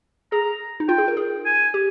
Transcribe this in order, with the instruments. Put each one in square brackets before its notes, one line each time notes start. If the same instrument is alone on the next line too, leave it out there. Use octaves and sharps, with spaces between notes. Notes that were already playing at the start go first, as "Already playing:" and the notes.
[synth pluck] G#4 [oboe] A#5
[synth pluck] D#4
[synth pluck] F4 [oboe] G5
[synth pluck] G#4
A#4
G#4
[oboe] G#5
[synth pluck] G4